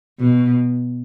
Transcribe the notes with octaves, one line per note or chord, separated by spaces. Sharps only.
B2